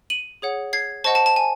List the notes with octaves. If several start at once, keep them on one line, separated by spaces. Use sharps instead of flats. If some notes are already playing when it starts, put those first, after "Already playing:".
D#7 F#7
G#4 C#5 F#5
G#6 C7
C5 D#5 F#5 A5 C#6
A5
A5
G#5